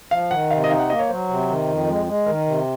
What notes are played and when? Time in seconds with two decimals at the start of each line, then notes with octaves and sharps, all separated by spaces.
0.11 F3 F5
0.31 D#3 F#5
0.50 C3 F5
0.64 D#5
0.70 D#4 F5
0.80 F#5
0.89 A#3 D#5
0.99 C#5
1.09 F#3 C5
1.29 C3
1.49 D#3
1.68 F2
1.87 G#3
2.07 G#3
2.26 D#3 A#4
2.46 C3